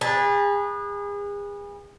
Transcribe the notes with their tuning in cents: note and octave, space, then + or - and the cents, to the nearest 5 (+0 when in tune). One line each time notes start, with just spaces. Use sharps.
G#4 -35 B4 -20 A5 +0